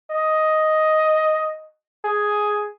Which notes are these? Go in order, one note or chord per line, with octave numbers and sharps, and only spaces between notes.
D#5
G#4